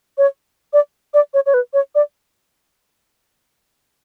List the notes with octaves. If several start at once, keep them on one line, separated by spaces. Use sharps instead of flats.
C#5
D5
D5
C#5
C#5
B4
C#5
D5